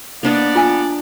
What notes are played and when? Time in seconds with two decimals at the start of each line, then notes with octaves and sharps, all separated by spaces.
0.23 A#3 B3 D4 D5 D#5
0.55 F4 G#5